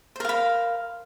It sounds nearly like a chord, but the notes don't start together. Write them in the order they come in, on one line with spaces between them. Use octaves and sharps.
C5 A#4 F5 B5